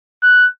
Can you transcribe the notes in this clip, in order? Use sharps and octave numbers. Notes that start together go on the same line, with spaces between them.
F#6